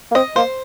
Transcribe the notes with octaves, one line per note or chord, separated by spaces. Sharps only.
A#3
C4 D#5
A#3 C5